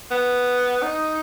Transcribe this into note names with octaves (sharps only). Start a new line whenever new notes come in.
B3
D#4